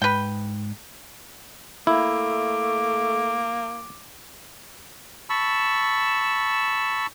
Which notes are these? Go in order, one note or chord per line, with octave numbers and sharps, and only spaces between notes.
G#2 B4 G5
A3 A#3 E4 D6
A5 B5 C#6 E6